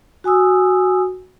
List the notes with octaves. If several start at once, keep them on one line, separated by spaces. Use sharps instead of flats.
F#4 G#5 D#6 E6